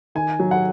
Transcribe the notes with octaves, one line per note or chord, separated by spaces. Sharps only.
D#3 G#5
F#3
F#5